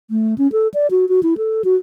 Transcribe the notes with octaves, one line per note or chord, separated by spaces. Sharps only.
A3
C#4
A4
D5
F#4
F#4
E4
A4
F#4